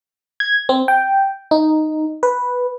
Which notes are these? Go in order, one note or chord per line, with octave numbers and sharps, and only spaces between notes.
G#6
C4
G5
D#4
B4